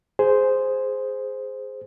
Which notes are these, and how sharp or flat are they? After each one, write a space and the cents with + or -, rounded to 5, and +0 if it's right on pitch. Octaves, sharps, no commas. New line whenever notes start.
G#4 +0 C5 -5